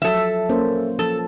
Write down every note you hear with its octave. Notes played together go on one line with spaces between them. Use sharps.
F3 F#3 A4 E5
A#3 C#4 C5
F3 A4